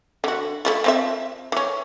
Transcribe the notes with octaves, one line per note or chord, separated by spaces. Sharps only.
D3 F#4
A3 E4 F4
F3 C4 E5
E3 C#4